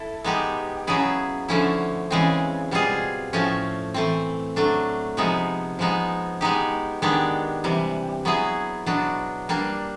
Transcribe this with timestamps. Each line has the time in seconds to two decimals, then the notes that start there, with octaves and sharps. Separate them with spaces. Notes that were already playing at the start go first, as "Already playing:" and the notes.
Already playing: E4 A4
0.24 G#3 B3 D#4 G4
0.87 C#3 F#3 B3 E4 G#4
1.48 D3 F3 A3 C#4 E4
2.10 C#3 E3 G#3 C4
2.71 B2 G3 C4 F4 G#4
3.33 A2 F3 A3 C#4
3.94 E3 A3 C4
4.56 F#3 A3 D4
5.17 C3 F3 G#3 B3 D#4
5.79 F3 G#3 B3 D#4
6.41 G#3 B3 D#4 G4
7.02 D#3 G#3 B3 D4 G4
7.64 C3 E3 G3
8.25 F#3 B3 E4 G#4
8.86 B2 F#3 B3 D4
9.49 G3 A#3 D4